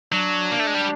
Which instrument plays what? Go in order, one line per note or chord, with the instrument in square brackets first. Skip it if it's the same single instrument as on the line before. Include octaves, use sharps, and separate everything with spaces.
[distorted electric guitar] F#3 [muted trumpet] D4
[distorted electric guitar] A#3
A3
G#3
G3